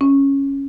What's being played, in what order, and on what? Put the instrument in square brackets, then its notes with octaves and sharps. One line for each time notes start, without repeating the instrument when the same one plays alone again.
[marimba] C#4